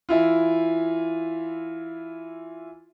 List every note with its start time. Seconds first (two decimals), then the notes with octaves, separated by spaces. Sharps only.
0.09 E3 E4 F4